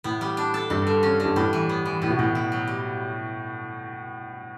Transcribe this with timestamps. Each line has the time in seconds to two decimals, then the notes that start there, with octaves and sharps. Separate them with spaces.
0.04 A2 B3
0.21 G3
0.37 D4
0.54 A4
0.70 G2 G3
0.87 D3
1.03 C#4
1.20 D3
1.25 G2
1.36 A2 G3
1.53 E3
1.69 B3
1.86 E3
2.02 A2 B3
2.10 B2
2.19 A2 F#3
2.35 E4
2.52 F#3
2.68 G3